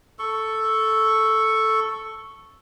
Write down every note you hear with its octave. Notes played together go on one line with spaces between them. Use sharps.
A4 C#6